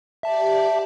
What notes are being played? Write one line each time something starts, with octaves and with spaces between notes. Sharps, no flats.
G4 D5 E5 A5